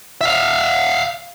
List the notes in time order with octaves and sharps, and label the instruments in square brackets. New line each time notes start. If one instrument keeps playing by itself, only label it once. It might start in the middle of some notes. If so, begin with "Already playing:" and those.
[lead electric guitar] E5 F5